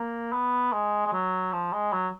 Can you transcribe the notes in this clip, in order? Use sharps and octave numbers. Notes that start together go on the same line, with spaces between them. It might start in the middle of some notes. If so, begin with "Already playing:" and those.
Already playing: A#3
B3
G#3
G#3
F#3
F3
G#3
F#3